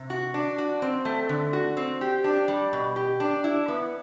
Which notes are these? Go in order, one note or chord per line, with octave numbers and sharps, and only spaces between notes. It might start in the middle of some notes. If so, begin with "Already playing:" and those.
Already playing: C3
F#4
D4
F#4
C4
A3
D3
F#4
C4
G4
D4
G3
B2
G4
D4
E4
B3